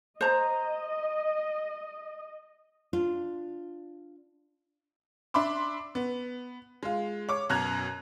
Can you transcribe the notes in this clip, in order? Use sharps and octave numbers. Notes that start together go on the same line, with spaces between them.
C5 D#5 A#5
D4 F4
D4 E5 B5 C6 D6
B3
G#3 F4
C#5 D6
F#2 B2 A#5 F#6 G#6 F7